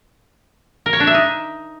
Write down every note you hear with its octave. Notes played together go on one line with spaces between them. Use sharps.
A#4
C#5
D4
E5
D#4